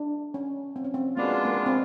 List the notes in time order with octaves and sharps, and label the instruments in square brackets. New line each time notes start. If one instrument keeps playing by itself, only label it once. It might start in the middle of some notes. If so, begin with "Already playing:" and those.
Already playing: [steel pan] D4
C#4
C4
C#4
C4
[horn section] B2 G#3 B3 D4 F4 [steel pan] A#3
[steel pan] A#3
C4